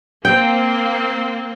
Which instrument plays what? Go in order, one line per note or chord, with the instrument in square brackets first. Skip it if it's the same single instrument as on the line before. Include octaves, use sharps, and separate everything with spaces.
[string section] A#3 C4 [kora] G5